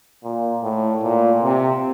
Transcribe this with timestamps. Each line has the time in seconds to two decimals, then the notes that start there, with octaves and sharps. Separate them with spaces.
0.24 A#2
0.63 A2
1.03 A#2
1.43 C3